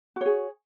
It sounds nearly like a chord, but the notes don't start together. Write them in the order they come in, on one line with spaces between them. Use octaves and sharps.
F#4 C#5 G#4